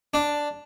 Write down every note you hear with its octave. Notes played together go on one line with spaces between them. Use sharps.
D4